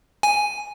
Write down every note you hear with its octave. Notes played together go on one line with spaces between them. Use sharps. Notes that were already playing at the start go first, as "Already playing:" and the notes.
G#5